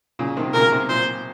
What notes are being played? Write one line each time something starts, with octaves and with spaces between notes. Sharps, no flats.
A#2 C#3
C3 D#3
A#2 C#3 A#4
C3
A#2 C5